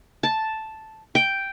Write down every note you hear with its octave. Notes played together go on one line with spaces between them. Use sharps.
A5
G5